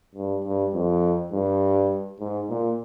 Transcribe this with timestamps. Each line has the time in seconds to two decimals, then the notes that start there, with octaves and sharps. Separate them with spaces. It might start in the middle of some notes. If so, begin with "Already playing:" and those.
0.15 G2
0.44 G2
0.74 F2
1.32 G2
2.20 G#2
2.49 A#2